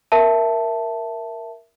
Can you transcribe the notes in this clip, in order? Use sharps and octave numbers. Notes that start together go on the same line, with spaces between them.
A#4 E5 A5